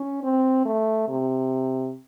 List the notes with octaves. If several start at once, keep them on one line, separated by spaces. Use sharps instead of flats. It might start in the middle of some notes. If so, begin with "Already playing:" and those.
Already playing: C#4
C4
A3
C3